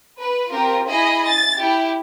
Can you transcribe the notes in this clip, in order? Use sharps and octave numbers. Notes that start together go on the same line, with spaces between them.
B4
C4 F4 G4 A#4
E4 G#4 D#5 B5
A6
E4 G4